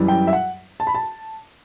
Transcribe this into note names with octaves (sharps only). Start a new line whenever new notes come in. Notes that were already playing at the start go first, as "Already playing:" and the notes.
Already playing: F#2 E3 G3
G5
E5
F#5
A5
B5
A5